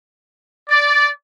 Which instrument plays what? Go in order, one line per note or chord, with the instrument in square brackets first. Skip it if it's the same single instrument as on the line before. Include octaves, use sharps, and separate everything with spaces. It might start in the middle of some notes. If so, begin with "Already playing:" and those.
[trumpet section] D5